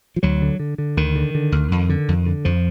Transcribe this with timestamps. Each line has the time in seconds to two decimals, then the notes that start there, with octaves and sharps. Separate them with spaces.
0.16 F3
0.23 D2 F#3
0.42 D3
0.60 D3
0.78 D3
0.97 D2 D#3
1.16 D3
1.35 D3
1.52 D2
1.71 F2
1.89 D3
2.08 F2
2.26 D3
2.45 F2 F3